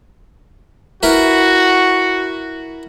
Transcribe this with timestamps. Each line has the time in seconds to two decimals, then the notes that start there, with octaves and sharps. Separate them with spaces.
1.03 E4 F#4 A#4 B4